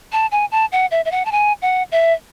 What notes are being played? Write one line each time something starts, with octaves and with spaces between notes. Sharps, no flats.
A5
G#5
A5
F#5
E5
E5
F#5
A5
G#5
F#5
E5